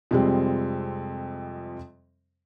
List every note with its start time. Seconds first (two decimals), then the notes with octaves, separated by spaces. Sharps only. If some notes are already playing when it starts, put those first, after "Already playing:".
0.11 F2 C3 G3 G#3 C4